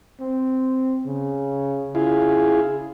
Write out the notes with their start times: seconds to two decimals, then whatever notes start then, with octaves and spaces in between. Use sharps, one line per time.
0.20 C4
1.05 C#3
1.95 C#3 E4 F4 G#4